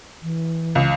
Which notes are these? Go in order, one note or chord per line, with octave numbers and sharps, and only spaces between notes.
E3
C#2